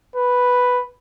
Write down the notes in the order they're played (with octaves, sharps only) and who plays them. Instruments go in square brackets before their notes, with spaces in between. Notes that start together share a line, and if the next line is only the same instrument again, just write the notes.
[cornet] B4